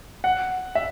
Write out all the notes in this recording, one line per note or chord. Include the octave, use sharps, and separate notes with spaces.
F#5
E5